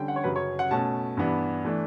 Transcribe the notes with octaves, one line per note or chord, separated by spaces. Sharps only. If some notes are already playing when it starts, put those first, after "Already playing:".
Already playing: D3 G3 C#4 G5
F#5
C#5
F#2 C#3 F#3 B4
C#5
F#5
B2 A3 C#4 A5
G2 E3 B3 D4
E3 A3 D4